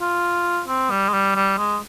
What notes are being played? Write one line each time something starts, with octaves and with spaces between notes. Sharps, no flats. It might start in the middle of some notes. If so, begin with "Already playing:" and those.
F4
C4
G3
G#3
G3
G3
G#3